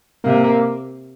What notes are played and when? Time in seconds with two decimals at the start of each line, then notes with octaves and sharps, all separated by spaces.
0.24 C3 A#3
0.44 A#3